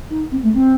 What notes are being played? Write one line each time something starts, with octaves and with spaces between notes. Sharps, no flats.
D#4
C4
A3
C4